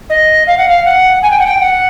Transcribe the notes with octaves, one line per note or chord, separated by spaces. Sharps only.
D#5
F5
F#5
F5
F#5
G#5
G5
F#5
G5
F#5